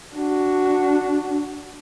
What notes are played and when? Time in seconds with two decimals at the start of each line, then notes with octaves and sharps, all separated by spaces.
0.16 D4 F#4